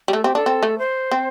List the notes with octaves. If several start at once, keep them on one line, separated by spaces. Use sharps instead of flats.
G3
A3 A4
C4 G4
D4 A4
C4
A3
C5
C4